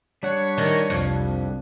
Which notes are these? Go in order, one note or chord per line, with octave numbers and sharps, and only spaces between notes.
G3 D4 C#5 F#5
D#3
C2 F2